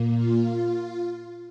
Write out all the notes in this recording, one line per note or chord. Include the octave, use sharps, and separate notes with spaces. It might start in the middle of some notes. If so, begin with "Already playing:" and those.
Already playing: A#2 A#3
F4